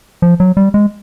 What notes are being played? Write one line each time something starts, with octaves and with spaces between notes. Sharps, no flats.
F3
F#3
G3
G#3